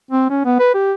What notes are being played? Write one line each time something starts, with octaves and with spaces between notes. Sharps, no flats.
C4
C#4
B3
B4
G4